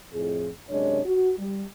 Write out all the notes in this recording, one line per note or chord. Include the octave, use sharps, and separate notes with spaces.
F2 A2 G#4
F#2 C3 G#3 D4 C#5
F#4
G3